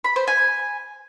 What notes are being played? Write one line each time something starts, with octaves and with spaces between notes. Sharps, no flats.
B5
C5
G#5